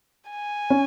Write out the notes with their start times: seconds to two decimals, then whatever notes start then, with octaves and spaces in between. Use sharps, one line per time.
0.31 G#5
0.70 C#4